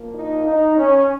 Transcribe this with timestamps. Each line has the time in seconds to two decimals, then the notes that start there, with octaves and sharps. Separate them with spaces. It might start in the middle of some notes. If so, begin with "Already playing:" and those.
Already playing: A#2 F3 A#3
0.15 D#4
0.46 D#4
0.77 C#4